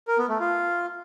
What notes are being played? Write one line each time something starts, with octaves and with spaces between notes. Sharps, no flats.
A#4
B3
A3
F4